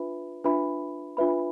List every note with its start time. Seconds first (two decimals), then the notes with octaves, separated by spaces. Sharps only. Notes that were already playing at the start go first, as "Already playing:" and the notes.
Already playing: D4 F4 B4 E5 B5
0.44 D4 F4 B4 E5 B5
1.17 D4 F4 B4 E5 B5